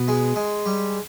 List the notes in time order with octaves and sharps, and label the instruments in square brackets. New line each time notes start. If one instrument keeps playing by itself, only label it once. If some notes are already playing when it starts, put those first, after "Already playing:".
Already playing: [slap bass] B2 [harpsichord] B3
[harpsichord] G#3
G#3
G3